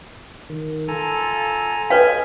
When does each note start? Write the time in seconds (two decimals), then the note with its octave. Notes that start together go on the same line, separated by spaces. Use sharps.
0.50 D#3
0.88 F4 A4 G#5 A#5
1.90 B4 C#5 D#5 F5 G#5